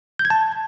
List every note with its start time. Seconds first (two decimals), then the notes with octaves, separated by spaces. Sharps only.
0.19 G6
0.25 G#6
0.30 A5